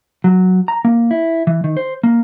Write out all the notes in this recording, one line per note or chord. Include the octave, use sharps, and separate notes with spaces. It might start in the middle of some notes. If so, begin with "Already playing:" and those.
F#3
A#5
A#3
E4
E3
D#3
C5
A#3